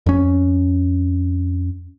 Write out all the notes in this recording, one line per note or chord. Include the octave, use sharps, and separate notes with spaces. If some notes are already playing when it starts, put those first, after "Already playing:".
F2 C#4